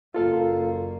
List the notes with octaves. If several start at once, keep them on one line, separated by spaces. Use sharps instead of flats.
F#1 A#3 F4 A4 F5